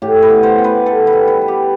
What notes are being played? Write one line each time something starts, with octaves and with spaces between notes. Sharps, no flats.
A2 G4
B4
B3
C5
B3
B4
B3 A4
B4
G3
B4
G3
G4